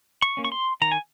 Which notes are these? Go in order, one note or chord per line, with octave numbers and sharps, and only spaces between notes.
C#6
A#3 C#4
C#6
C6
D#3 A#5
G#5